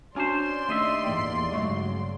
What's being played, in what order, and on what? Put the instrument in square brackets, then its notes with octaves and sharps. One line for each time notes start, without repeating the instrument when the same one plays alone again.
[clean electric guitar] C#4 C5 [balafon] D4 F#4 G#5 [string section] D5 C6
[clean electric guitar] D#2 D#5 E5 [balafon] A3 D4
[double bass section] E2 A2 A#3 [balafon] G5
[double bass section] G1 C#3 F#3 [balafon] G#3 A3 C#6